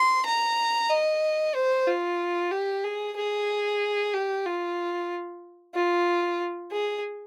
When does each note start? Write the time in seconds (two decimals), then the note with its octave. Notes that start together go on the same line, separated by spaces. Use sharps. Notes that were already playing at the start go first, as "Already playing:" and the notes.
Already playing: C6
0.25 A#5
0.90 D#5
1.55 C5
1.87 F4
2.51 G4
2.84 G#4
3.17 G#4
4.14 G4
4.46 F4
5.75 F4
6.72 G#4